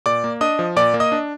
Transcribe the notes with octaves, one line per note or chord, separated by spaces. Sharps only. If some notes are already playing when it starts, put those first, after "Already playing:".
A#2 D5 D6
A#3
D4 D#5 D#6
F3
A#2 D5 D6
A#3
D#5 D#6
D4